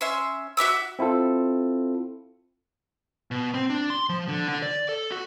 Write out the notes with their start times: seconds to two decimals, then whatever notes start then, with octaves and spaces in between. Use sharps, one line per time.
0.01 C#4 E5 C6
0.57 F#4 E5 D6 E6
0.99 C4 E4 F4 A4
3.31 B2
3.54 C4
3.70 D4
3.90 C6
4.09 F3
4.28 D3
4.48 D3
4.63 D5
4.89 A4
5.11 F#4